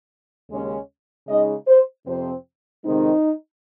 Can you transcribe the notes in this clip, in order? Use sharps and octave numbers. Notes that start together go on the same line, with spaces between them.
D#2 C#3 G#3 C#4
C#3 G#3 D#4 D#5
C5
F2 C3 F3 C4 C5
F2 C3 D#3 G#3 C4 D#4